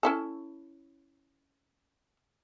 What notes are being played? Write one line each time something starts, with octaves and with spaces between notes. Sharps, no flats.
C#4 E4 A4